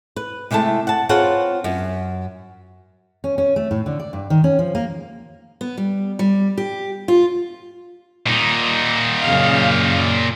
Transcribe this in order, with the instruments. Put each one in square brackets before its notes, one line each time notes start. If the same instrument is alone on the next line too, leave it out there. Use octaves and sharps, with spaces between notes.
[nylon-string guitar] B4
C3 G#3 A3 E4 A5
F#5 A5
C4 F4 G#4 B4 C#5 F#5
F#2
[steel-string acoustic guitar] C#4
C#4
A3
A2
D3
D5
G2
D#3
C#4
F3
A#3
B3
G3
G3
G4
F4
[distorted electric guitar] A#2 D#4
[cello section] F#2 C#3 F5